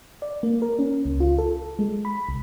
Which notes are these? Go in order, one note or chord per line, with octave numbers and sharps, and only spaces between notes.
D5
A#3
A#4
C#4
C#2
F4
A4
G#3
B5
C2